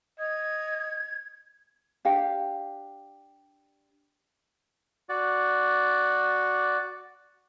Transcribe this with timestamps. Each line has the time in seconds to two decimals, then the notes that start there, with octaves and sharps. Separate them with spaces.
0.19 D#5 G#6
2.05 D4 G4 F5
5.09 F#4 D5